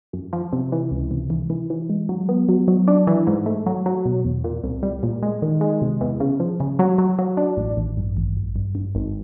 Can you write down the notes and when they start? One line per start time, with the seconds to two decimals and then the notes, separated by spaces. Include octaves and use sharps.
0.13 F#2
0.33 F3
0.53 C3
0.72 E3
0.91 C#2
1.11 C3
1.30 E3
1.50 E3
1.70 E3
1.89 G#3
2.09 F#3
2.29 B3
2.49 F#3
2.68 F#3
2.88 D4
3.07 E3
3.27 G#2
3.46 A3
3.66 F#3
3.86 F#3
4.05 B2
4.25 E2
4.44 A#2
4.63 C2
4.83 G3
5.03 A#2
5.23 G#3
5.42 D#3
5.61 G#3
5.82 C3
6.01 E2
6.20 C#3
6.40 F3
6.60 C#3
6.79 F#3
6.98 F#3
7.19 F#3
7.37 D4
7.57 A1
7.77 A1
7.97 G2
8.17 A1
8.36 G#1
8.56 G2
8.75 G2
8.95 G#1